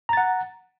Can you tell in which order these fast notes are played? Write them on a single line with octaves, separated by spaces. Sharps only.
A#5 A6 F#5